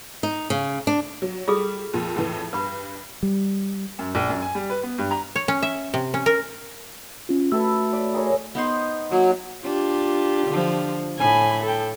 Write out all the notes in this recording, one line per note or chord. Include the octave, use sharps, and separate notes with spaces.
D#4
C#3
D4
F#3
G3 F4 G#4 A4
F2 A#2
F2 A2 E3
G2 B4 B5
G3
F#2
A#1
F#2
G#5
G3
B4
B3
G2
A#5
C#5
C#4
E5
C3
C#4
A#4
C#4 F4
A3 E4 F#4 A4 B4 E6
D5 B5
G#4 A#4 C#5
B3 D#4 C5
F#3 A#3
D4 F4 G4
D3 F3
A2 G#5 B5
A4 G5